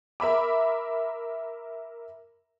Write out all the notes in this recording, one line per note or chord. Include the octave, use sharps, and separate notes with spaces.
A#4 E5 B5 D6